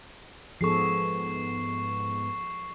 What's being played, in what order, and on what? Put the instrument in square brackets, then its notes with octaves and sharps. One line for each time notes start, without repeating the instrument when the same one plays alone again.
[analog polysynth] G#2 B3 [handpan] F3 G#4 A4 [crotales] C#6 C7